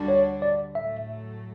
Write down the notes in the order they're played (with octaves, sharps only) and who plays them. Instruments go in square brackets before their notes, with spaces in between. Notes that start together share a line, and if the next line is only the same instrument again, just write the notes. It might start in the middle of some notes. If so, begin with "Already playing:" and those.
Already playing: [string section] D2 D3 G3 D4 F#4
[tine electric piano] C#5
D5
[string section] A2 F#3 A3 [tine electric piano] E5